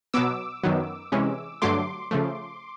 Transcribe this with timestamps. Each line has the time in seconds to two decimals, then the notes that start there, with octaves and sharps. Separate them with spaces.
0.14 B2 F#3 B3 D6 E6
0.63 F#2 D#3 F#3 B3
1.12 C3 E3 G#3 C#4
1.62 G2 D3 F#3 A3 C6 D6
2.11 C#3 F3 A3